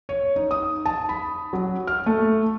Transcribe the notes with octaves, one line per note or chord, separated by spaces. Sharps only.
C#5
D#4
D#6
A5
B5
F#3
F6
A3